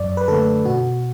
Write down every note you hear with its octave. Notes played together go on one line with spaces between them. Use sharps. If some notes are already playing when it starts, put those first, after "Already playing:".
Already playing: F#2 D5
B4
D3 A3 A4
B2 F#4